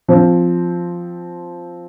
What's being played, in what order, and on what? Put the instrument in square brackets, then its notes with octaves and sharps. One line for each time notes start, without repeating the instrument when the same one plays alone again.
[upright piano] F3 C4